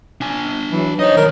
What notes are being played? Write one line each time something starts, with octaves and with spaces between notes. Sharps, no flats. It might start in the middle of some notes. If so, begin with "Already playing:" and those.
D4 G#5
E3 F#3
D#4 C5 C#5 D#5
D#3 F#3 A#4